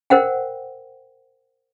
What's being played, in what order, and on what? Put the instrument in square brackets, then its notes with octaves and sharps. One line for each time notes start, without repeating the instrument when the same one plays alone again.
[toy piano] A#4 C5 F#5 G5